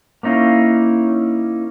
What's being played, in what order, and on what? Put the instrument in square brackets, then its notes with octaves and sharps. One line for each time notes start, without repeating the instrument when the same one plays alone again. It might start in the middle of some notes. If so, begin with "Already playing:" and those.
[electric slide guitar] A#3 C#4 D#4 E4 F5